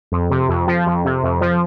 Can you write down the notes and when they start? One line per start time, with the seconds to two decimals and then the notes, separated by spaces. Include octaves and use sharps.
0.12 F2
0.30 C3
0.49 F2
0.67 F3
0.87 F2
1.05 C3
1.23 F2
1.41 F3